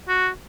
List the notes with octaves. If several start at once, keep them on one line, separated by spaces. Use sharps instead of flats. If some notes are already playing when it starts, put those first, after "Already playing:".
F#4